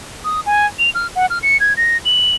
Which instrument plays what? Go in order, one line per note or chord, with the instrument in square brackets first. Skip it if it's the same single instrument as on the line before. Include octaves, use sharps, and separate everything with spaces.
[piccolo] D#6
G#5
F7
F6
F#5
F6
C#7
G#6
A#6
F#7